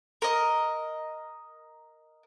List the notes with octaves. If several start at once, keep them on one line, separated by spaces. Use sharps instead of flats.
A#4 D#5